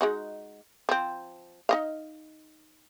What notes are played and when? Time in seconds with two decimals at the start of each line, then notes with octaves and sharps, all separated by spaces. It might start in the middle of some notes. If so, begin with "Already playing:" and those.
0.01 G#3 D#4 F#4
0.89 F3 C4
1.69 D#4 D#5 F5